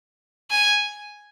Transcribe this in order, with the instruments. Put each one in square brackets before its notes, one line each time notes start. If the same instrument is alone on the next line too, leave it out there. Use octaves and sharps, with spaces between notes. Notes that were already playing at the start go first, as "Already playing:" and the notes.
[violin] G#5